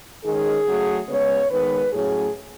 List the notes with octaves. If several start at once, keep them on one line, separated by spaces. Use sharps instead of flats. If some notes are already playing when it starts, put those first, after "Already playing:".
D#3 G#3 C#4 G#4
C#3 F#3 A3
C#3 G#3 B3 C#5
D#3 G#3 B3 B4
A2 F#3 C#4 G#4